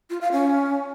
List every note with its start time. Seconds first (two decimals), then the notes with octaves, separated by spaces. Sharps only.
0.10 F4
0.21 F5
0.32 C#4